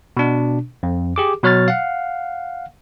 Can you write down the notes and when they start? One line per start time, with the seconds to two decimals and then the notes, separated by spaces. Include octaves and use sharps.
0.17 B2 D4
0.83 F2
1.16 G4 G#4 D6
1.43 B2 F#3 C#5 F6 A6
1.68 F5 F#5